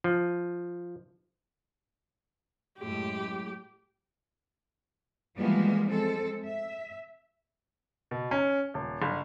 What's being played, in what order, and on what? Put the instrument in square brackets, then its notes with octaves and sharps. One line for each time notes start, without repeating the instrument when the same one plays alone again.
[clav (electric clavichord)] F3
[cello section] F#2 A2 G#3 [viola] G4
[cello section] E3 F3 G3 G#3 A#3 B3
G#3 C4 A4
E5
[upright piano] B2
C#4
D#1
G1